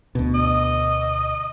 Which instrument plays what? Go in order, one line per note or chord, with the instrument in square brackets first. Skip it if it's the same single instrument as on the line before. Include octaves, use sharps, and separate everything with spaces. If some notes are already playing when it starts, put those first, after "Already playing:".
[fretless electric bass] D2 B2
[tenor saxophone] D#5